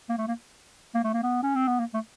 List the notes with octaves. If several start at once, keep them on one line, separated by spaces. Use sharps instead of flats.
A#3
A3
A#3
A#3
A3
A#3
B3
C#4
C4
B3
A#3
A3